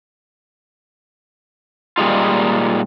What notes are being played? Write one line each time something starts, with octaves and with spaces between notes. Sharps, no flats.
A#2 G3 G#3 D#4 F4